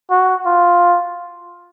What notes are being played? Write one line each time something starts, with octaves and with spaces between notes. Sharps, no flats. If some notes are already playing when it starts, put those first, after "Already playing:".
F#4
F4